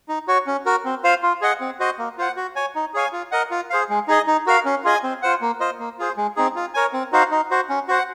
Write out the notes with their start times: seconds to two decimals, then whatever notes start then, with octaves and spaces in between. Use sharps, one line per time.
0.09 D#4
0.28 F#4 C#5
0.47 C#4
0.66 F#4 A#4
0.85 C4
1.04 F4 C5 F5
1.23 F4
1.42 G#4 D#5 F#5
1.60 C4
1.80 F#4 C5 D#5
1.99 A#3
2.18 F4 C5 F#5
2.37 F#4
2.56 C#5 G#5
2.75 D#4
2.94 G#4 C#5 F5 G#5
3.12 F4
3.32 A#4 D#5 F#5
3.51 F4
3.70 G#4 C5 F5
3.89 G#3
4.08 D#4 G#4 D#5
4.27 D#4
4.46 F#4 A#4 F5
4.65 C#4
4.84 F4 G#4 D#5 G#5
5.03 C4
5.22 F4 C5 F#5
5.41 A#3
5.60 F4 C5 D#5
5.79 A#3
5.98 F4 G#4 C5
6.17 G#3
6.36 C4 D#4 G#4
6.56 F4
6.74 A#4 C#5 G#5
6.93 C4
7.12 D#4 F#4 C5 F5
7.31 D#4
7.51 F#4 C5
7.69 C#4
7.88 F#4 C5 F#5